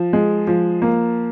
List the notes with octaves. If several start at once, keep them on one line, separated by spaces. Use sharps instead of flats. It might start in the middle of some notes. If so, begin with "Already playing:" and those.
Already playing: F3
G#3
F3
A#3